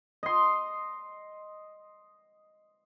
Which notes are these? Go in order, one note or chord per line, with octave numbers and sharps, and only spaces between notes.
D#5 C6